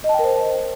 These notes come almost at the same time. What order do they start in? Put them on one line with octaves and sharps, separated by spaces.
D#5 A5 G5 A#4 C5